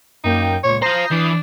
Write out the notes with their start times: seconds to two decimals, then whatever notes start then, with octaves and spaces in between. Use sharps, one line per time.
0.24 F#2 A#3 D#4 G5
0.64 C#2 A#2 C#5
0.82 F4 C5 A#5 D#6 G6 C7
1.11 E3 D4